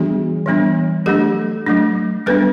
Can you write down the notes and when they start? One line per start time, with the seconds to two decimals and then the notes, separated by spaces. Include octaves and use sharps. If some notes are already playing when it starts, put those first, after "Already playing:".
Already playing: E3 G3 B3 D4 F#4 G#4
0.46 E3 G3 B3 D4
1.06 F#3 A3 D4 G4 A4
1.66 F#3 A3 D4
2.26 G3 B3 D4 A4 B4